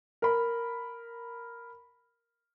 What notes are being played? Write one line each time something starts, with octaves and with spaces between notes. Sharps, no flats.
A#4 B5